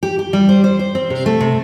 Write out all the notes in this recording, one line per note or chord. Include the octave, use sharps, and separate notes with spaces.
G4
G4
G3
C5
C5
C5
C4
C3
A3
C3